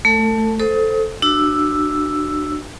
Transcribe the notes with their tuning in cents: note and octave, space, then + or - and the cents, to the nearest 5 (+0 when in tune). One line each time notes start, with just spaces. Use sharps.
A3 +0 A4 +35
A4 +0 C5 +0 D#6 +35
D4 +30 F#4 +20 E6 +5